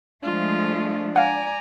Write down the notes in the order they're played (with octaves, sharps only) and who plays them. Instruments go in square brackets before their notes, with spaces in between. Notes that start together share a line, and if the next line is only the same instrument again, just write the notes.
[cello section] F3 G#3 A3 [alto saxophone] D4 [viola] F4
[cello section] D5 [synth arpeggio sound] F5 F#5 [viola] G#5 A#5